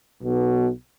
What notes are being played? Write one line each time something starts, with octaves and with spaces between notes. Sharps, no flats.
B1 B2